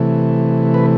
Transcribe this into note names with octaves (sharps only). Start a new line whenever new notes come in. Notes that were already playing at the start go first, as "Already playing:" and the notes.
Already playing: C3 E3 A3
B4